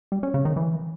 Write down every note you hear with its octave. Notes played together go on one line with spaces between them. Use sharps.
G3
C#4
C#3
D#3
E3